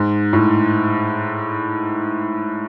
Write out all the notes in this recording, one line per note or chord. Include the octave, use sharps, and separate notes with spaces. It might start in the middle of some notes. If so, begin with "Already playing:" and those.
Already playing: G#2
A2